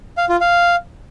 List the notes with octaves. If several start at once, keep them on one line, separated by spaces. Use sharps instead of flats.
F5
F4
F5